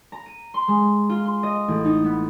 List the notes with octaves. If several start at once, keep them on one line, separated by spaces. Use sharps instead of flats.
A#5
D#7
C6
G#3
F4
C6
D#5
A1
D#4
B3